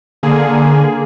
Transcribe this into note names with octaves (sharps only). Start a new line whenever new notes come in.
D3 A#3 G#4